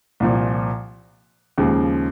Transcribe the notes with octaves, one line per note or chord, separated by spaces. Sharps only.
C2 A#2 F3
D#2 C#3 F3 G#3